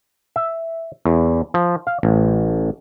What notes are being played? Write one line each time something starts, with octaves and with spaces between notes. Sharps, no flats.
E5
E2
F3
F5
A1